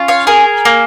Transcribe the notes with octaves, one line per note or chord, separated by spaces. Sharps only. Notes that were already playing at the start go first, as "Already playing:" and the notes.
Already playing: C#4 F4
C#5 F5
G#4 A#4
A#3